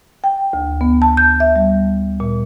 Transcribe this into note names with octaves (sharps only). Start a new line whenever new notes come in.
G5
D2
B3
A5
G6
E5
G3
A#2